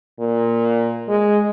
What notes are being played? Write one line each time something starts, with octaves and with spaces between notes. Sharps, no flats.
A#2
G#3